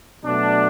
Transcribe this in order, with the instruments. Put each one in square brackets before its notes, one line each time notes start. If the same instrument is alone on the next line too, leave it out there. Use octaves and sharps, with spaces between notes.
[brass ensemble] B2 F#3 A3 D4